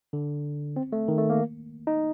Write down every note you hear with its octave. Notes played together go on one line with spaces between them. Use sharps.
D3
C4
A3
D#3
A3
A#3
D#4